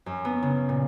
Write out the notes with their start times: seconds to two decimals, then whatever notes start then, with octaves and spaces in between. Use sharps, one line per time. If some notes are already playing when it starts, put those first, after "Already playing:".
0.06 F#2
0.25 B3
0.43 C#3
0.69 A#2